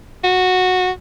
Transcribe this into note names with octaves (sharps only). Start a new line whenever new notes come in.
F#4